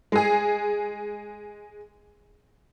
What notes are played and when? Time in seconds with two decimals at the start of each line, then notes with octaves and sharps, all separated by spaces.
0.12 G#3 G#4